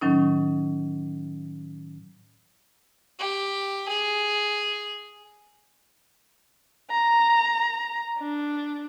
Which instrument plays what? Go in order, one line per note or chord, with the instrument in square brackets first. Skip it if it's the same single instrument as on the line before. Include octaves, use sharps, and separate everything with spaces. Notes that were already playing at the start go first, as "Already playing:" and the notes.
[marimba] A2 D#3 F#3 C#4 D#4
[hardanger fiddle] G4
G#4
[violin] A#5
D4